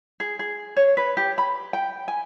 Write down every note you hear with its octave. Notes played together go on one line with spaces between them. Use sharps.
G#4
G#4
C#5
B4
G4
B5
G5
G#5